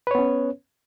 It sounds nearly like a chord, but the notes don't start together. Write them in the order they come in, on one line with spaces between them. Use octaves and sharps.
B4 C#5 B3 C#4